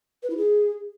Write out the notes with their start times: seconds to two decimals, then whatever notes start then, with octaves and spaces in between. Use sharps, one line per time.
0.23 B4
0.30 E4
0.37 G#4